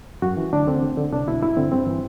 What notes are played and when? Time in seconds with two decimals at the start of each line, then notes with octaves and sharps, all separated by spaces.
0.22 F#2 F#4
0.37 E3
0.53 D2 D4
0.67 D3 C4
0.83 D2
0.97 D3
1.12 C2 D4
1.28 B2 E4
1.42 G2 E4
1.57 D3 C4
1.72 G2 C4
1.87 E3